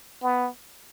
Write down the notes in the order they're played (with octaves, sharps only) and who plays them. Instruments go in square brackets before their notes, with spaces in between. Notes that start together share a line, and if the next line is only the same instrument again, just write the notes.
[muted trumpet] B3